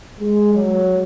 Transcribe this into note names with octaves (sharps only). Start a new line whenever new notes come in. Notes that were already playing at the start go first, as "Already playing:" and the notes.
G#3
F#3